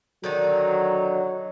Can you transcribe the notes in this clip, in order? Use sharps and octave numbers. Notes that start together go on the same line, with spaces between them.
D3 D#3 F#3 D#4